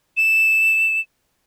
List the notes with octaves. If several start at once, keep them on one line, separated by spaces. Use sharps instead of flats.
E7